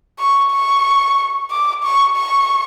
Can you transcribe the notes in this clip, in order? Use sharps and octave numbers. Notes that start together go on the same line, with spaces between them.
C#6
C#6
D6
C#6
C#6